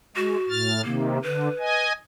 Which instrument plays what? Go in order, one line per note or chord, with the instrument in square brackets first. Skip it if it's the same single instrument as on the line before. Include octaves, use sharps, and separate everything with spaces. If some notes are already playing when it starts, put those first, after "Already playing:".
[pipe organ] G#3 [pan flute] F#4
[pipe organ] A2 F6 A6
[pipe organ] C3 D#3 [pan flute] A#3
[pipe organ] D3 [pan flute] B4
[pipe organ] D#5 G#5